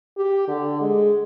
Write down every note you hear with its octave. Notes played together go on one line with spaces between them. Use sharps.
G4
D3
G#3